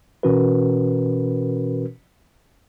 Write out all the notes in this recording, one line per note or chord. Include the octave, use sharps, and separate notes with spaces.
B2 E3 C#4 F#4 A#4 B4